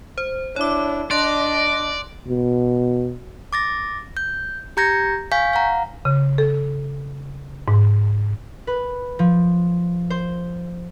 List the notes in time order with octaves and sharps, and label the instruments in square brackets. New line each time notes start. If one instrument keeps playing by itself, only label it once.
[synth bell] C5
[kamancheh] D4 E4 [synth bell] C#5 D6
[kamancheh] D4 D#5 [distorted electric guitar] D5 [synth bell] C6 F#6 A#6
[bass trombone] B2
[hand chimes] D6 A6 A#6
G6
G4 A#5 G6 G#6 A#6 C#7
F5 G#5 C#6 G6 B6
F5 F#5 A#5
[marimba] C#3
A4
G#2
[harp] B4
F3
C5